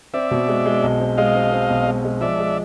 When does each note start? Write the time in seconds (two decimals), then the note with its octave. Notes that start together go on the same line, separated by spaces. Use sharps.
0.14 C4 D5 E5
0.31 B2
0.48 G#3
0.66 G#3
0.83 B1
1.00 C4
1.17 G#3 D#5 F5
1.35 C4
1.52 C4
1.70 B1
1.87 G#3
2.05 G#3
2.21 F3 D5 E5
2.39 G#3